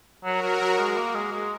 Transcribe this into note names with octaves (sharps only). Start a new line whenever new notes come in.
F#3 F#4 A#4
F#3
F#3
G#3
A#3
G#3
G#3